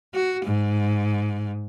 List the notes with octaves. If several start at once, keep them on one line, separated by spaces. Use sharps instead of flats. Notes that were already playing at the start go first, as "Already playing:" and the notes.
F#4
G#2